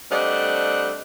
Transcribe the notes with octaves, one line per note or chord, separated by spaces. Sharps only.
G3 A3 C4 D4 D#5 F#5